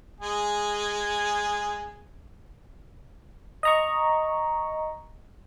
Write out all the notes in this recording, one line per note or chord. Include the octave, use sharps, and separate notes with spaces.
G#3 G#4
D#5 A#5 C#6